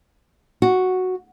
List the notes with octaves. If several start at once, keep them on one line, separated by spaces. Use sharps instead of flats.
F#4